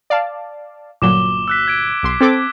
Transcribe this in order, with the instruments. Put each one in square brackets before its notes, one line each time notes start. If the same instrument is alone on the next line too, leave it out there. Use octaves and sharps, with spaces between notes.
[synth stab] D5 F5 A5
[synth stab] G1 A#2 F#3 [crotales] D6 E7 G7
[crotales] E6 F#6 B6
G#6 D7
[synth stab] B1 C6
[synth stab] C4 A4 D6 [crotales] G#6